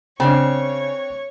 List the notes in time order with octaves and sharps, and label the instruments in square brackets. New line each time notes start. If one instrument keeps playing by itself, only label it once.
[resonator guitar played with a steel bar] C#3 [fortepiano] C4 D4 [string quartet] C#5